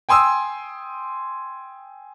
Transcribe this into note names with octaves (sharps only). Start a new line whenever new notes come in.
G5 G#5 C6 D#6 E6